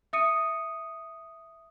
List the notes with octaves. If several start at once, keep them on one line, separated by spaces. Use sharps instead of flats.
E5 D#6 C#7 D#7